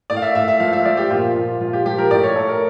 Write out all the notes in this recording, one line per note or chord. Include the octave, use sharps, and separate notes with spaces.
A2 D5
F5
E5
A2 E5
E5
F3 F5
E5
F3 D5
G4
A#2 F4
A#2
F3 F4
G4
F3 G4
A#4
A2 D5
C#5
A2 A4
A#4